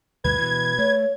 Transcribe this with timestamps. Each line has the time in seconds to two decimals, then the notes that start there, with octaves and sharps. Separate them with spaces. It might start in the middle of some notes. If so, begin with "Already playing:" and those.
0.24 D2 G2 B2 B4 G#6
0.38 B2 E3
0.78 A3 C#5